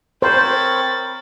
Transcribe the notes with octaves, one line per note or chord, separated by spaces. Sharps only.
C4 A#4 C5 C#5 B5 A6